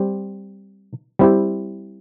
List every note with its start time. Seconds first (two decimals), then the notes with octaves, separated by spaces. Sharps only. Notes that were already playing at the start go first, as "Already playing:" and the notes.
Already playing: G3 C4 G4
1.19 G3 C4 E4 G4